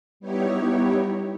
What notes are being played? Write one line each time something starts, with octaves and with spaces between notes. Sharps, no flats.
G3 B3 D#4 E4 G4 C#5